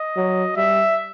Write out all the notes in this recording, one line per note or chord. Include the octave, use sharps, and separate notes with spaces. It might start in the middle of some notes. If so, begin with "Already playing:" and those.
Already playing: D#5
F#3
G3 E5